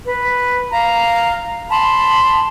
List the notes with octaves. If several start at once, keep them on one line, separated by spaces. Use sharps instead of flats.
B4
F5 A#5
A5 B5 C6